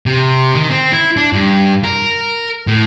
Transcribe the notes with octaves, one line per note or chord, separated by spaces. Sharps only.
C3
D#3
C4
E4
D4
G2
A#4
A2